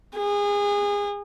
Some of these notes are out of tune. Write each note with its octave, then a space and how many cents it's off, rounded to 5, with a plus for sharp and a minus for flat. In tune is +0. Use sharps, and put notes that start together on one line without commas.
G#4 -30